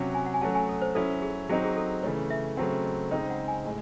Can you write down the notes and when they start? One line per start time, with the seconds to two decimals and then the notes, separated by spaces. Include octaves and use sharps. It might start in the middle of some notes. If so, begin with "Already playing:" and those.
Already playing: C3 F#3 C#4 F#4
0.14 G#5
0.26 F#5
0.34 G#5
0.41 F#3 A3 C#4 F#4 A5
0.55 G#5
0.69 A4
0.82 C5
0.95 F#3 C#4 E4 A4
1.22 G#4
1.49 F#3 C4 D#4 G#4
1.64 G#4
1.77 A4
2.03 C#3 E3 A3 C#5
2.30 E5
2.57 C#3 F#3 A3 C4 F#5
2.85 D#5
3.11 C#3 G#3 C4 D#4 C5
3.30 F#5
3.48 G#5
3.65 A2 G#3 G#5